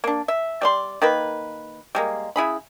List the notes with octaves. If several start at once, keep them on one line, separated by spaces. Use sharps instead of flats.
A#3 D4
E5
G3 D5 C6
D#3 A#3 B4
G3 G#3 A#3
C#3 E4 G#4 B5